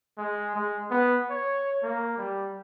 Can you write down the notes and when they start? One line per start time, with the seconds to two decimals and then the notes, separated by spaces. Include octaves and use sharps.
0.18 G#3
0.56 G#3
0.91 B3
1.30 C#5
1.83 A#3
2.17 G3